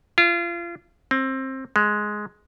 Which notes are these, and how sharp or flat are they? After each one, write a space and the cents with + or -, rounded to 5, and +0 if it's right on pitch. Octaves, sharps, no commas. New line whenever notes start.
F4 -30
C4 +20
G#3 +10